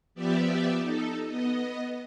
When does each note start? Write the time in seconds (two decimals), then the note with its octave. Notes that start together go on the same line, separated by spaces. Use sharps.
0.15 F3 B3 G4 D5 E5
0.79 D#4 A4
1.26 B3 D#5